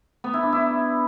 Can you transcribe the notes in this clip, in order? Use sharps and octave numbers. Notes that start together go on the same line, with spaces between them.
B3
E4
D4
E4